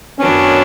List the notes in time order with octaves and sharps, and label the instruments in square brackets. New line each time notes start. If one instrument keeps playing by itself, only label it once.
[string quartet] F#2 D#3 F#3 B3 D4 [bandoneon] C#4